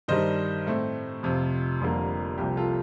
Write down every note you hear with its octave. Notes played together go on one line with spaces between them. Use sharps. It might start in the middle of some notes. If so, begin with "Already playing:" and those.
G2 D#3 G3 D4 C5 D#5
A2 A3 C4
F2 C3 F3 F4
F1 F2 D3 G3 A#3
C2 C3 F3 A#3 G4
F4 A4